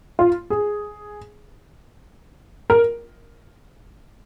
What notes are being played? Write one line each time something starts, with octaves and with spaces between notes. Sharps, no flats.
F4
G#4
A#4